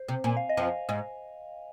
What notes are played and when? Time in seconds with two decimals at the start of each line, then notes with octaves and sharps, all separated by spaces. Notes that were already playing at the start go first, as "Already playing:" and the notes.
Already playing: C5
0.08 C3
0.24 A#2 G#5
0.37 F5
0.49 D#5
0.57 F2 F3 F5
0.89 G#2 G#3